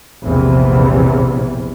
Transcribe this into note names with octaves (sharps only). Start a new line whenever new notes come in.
A#1 E2 C3 E3